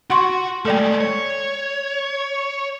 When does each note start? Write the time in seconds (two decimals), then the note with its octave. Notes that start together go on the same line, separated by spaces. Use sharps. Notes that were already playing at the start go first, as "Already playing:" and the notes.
0.10 F#4 F#5 C6 C#6
0.65 G#3 A3 A4 D5 G5
1.01 C#5